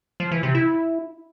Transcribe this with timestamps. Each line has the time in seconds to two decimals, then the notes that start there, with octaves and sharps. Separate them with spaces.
0.20 F3
0.31 E3
0.43 C3
0.55 E4